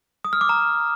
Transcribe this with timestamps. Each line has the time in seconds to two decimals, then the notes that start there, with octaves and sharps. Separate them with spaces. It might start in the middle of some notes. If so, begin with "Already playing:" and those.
0.25 D#6
0.33 F6
0.41 D6
0.49 A#5